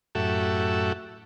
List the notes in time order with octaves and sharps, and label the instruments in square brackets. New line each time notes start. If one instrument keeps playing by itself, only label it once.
[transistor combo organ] F#2 A2 F#4 G4 A4 E5